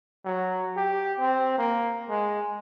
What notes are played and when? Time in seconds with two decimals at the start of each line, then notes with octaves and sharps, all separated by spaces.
0.25 F#3
0.77 G4
1.19 C4
1.58 A#3
2.09 G#3